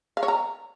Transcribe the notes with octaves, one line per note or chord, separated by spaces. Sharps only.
F5
C#5
A#5